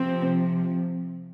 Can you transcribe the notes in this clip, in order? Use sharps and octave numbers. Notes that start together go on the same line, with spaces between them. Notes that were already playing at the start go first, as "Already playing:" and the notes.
Already playing: C3 F3 C4